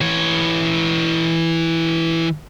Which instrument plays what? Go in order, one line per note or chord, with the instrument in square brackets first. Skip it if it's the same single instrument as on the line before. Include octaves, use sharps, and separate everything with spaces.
[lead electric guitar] E3 C#5